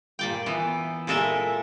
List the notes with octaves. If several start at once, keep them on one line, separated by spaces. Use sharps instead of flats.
A#2 D5 G5
E3 B3
A#2 G#3 A4 A#4 E5